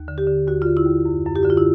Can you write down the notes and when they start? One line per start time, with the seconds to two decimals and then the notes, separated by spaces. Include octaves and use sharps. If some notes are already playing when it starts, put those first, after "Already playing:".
Already playing: D#2
0.08 D3
0.18 G4
0.27 D3
0.47 D#2 F#4
0.62 D3 F4
0.77 E4
0.86 D#2
1.05 F#2
1.26 F#2
1.36 G4
1.43 D3 F#4
1.50 F4
1.57 E4